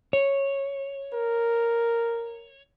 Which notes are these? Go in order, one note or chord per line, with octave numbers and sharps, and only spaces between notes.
C#5
A#4